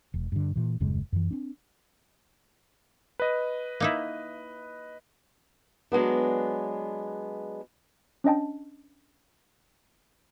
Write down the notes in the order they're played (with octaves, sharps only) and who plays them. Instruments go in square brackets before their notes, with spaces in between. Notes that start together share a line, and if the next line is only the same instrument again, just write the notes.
[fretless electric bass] E1
G2 D3
A#2 E3
D#1 F#2 C#3 G#3
F#2 E3
C4 D4
[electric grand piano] B4 D#5
[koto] A#3 D#4 E4
[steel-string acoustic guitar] F#3 G#3 B3 D4
[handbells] C#4 D4 D#5 G5 A5